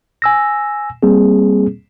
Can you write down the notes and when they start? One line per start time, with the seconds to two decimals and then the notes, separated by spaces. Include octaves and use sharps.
0.22 G#5 E6 A#6
1.03 G3 A#3 C4 G#4